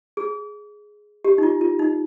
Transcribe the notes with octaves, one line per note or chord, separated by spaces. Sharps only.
G#4
G4
D#4
F4
F4
D#4